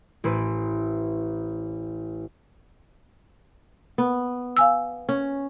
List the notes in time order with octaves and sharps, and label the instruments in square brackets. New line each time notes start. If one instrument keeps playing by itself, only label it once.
[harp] A1 E4 B4 C5 D7 D#7
[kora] B3
[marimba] F5 G#5 E6
[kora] C#4